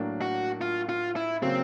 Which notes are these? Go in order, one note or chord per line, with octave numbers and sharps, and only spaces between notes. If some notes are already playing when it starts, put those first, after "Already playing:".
Already playing: A2 F#3 A#3 D4
F#4
F4
F4
E4
C#3 F#3 A#3 C4